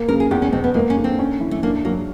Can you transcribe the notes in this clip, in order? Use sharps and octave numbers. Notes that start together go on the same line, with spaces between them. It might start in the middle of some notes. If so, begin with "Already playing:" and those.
Already playing: A#3
C#3 A#4
G#4
E2 G4
C#4
B2 C4
B3
G#3 A#3
C#4
D3
C4
C#4
E3
A3
A#3 D4
F#3 A#3